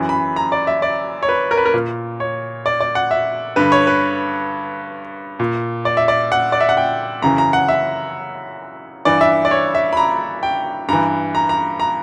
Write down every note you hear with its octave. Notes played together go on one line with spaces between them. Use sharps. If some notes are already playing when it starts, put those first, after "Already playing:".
Already playing: F#2 E3
B5
A#5
D5
E5
D5
C#5
B4
A#4
B4
A#4
A#2
C#5
D5
D5
F#5
E5
G2 D3 B4
C#5
B4
A#2
D5
E5
D5
F#5
D5
E5
F#5
G5
F#2 C#3 E3 A#5
A#5
F#5
E5
G2 E3 D5
E5
D5
C#5
E5
B5
A#5
G5
G2 E3 A#5
A#5
A#5
A#5